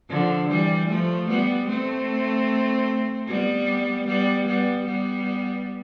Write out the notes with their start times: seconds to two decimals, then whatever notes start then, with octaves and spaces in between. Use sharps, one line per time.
0.09 D3 F3
0.49 E3 G3
0.89 F3 A3
1.28 G3 B3
1.68 A3 C4
3.28 G3 B3
4.06 G3 B3
4.46 G3 B3
4.85 G3 B3